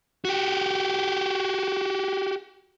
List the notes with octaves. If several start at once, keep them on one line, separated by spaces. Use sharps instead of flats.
F#4 G4